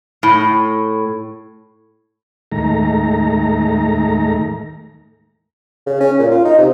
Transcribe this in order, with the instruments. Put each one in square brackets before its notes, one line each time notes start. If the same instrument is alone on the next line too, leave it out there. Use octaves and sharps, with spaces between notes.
[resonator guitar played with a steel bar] A2
[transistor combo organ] D#2 A2 D#3 G#3 A3 A#5
[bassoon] C#3
C#4
A#2
F4
D#4
C3